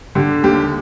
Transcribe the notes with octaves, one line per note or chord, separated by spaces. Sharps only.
D3 G4
D#2 G4